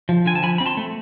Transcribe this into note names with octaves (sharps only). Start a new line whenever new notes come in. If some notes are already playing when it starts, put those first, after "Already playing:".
F3
D3 G#5
A5
F3 G#5 B5
C4 B5
A5 C6
A3